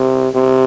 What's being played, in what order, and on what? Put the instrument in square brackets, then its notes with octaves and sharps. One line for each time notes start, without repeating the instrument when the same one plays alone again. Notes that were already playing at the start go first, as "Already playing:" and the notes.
Already playing: [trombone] C3
C3